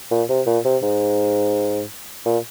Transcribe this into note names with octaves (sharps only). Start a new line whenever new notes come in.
A#2
C3
A#2
C3
G#2
A#2